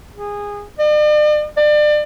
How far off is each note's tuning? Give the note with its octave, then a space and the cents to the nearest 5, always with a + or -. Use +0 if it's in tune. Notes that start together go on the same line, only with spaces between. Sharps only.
G#4 -20
D5 +45
D5 +30